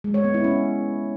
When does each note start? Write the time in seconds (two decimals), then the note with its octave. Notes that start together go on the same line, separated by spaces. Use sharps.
0.04 G#3
0.14 C#5
0.24 B3
0.34 E4
0.44 C#4